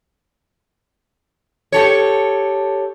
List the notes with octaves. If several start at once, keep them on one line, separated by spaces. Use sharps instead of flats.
G4 A4 C#5